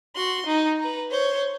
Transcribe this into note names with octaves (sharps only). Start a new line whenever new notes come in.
F#4 C6
D#4
B4 A#5
C5 C#5